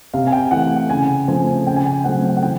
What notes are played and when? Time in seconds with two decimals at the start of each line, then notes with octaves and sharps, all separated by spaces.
0.14 C3 F5
0.27 G#5
0.32 G5
0.51 E3 A3 F#5
0.90 C#3 G#5
1.28 F3 A3 C4 G#5
1.67 C#3 G5
1.76 G#5
1.86 G5
2.04 F#3 A3 C4 F#5
2.37 F#5
2.43 E3 G5